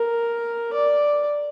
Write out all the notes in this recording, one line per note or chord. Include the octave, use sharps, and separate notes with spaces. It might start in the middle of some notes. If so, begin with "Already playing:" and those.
Already playing: A#4
D5